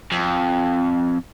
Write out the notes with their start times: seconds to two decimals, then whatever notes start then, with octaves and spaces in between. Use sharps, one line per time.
0.12 F2